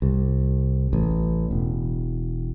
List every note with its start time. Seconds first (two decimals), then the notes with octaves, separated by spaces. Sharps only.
0.02 C2
0.93 A1
1.51 E1